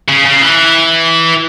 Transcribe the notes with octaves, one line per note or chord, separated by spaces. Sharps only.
C#3
C#3
E3